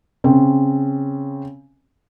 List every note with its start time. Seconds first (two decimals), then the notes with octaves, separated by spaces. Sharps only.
0.24 C#3 C4